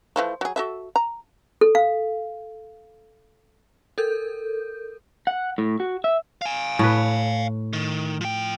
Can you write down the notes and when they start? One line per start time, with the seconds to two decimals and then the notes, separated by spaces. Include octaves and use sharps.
0.16 E3 F3 A3
0.41 F#3 G#4
0.56 F#4 A4 E5
0.96 A#5
1.61 A4
1.75 F5
3.98 A4 A#4 G6
5.27 F#5
5.58 A2
5.80 F#4
6.04 E5
6.42 F5 G#5
6.79 A2 B4
7.73 D#3
8.21 F3 G5